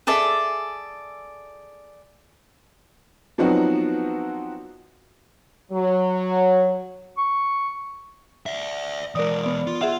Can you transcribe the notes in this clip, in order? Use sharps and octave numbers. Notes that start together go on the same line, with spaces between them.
G#4 A4 D5 E5
F3 F#3 B3 C4 D#4 F#4
F#3
C#6
D5 E5
E3 G#3 A#4 D5 D#6
B3 D5
F4
F4 G#4 E5 F#5